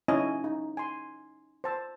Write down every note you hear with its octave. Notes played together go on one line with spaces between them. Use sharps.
C#4 D#4 E4 D#5 G#5
D#4
G#5 C6
C5 A5 E6